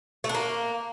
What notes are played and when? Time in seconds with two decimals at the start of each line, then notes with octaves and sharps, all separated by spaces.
0.24 A3
0.29 D4
0.35 A#3